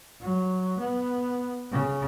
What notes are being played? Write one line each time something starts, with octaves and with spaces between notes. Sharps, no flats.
F#3
B3
C#3